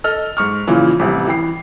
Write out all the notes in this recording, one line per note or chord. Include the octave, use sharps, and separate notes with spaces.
A4 D#5 F6
G#2 C#6 F6
A#2 C#3 E3 F3
A1 C3 G3
E3 G5 C7